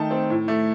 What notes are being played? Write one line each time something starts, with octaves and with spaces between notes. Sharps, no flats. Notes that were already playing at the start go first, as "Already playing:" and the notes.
Already playing: D#3 A3 D#4 G5 A5
C4
A2
A3